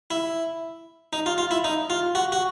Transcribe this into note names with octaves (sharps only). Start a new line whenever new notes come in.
E4
D#4
F4
F4
E4
D#4
F4
F#4
F#4